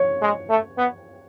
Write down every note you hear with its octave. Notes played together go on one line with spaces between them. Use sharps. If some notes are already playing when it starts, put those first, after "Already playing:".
Already playing: C#5
G#3
A3
B3